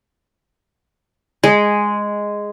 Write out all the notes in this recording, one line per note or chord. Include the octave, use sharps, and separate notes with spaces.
G#3